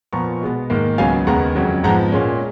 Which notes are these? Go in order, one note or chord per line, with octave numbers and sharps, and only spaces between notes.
A#2 F3 B3 A#5 C#6
B2 G#3 B3
G#2 D#3 A#3
C#2 C#3 F#3 B3 F5 G#5
D#2 C#3 G#3 B3 F#5 A#5
F2 C#3 F#3
G#2 F3 G#3 B3 F#5 A#5
A#2 G#3 C#4